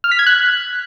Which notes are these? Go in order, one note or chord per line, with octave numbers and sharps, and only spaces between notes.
F6
B6
G#6
F#6